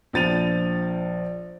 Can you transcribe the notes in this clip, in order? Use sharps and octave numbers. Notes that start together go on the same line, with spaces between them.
A#1 F3 A6 D#7 F7